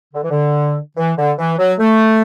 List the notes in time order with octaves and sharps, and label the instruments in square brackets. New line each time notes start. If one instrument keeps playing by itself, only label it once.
[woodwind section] D3
E3
D3
E3
D3
E3
F#3
A3